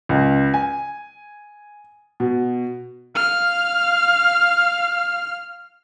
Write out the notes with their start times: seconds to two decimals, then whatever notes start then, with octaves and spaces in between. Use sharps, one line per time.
0.09 C#2
0.54 G#5
2.20 B2
3.16 F5 F6